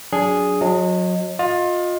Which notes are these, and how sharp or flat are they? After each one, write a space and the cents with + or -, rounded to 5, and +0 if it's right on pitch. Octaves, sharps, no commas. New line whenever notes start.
F#3 -5 D4 -20 G#4 +0
F#3 -35 D#5 +0
F4 +25 D#5 +0